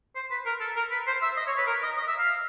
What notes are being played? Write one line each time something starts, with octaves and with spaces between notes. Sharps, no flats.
C5
B4
A#4
A4
A#4
B4
C5
E5
D#5
C#5
B4
A#4
D#5
D#5
E5
F5